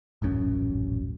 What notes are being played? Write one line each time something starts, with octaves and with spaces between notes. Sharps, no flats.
D#1 A1 F#2 C#4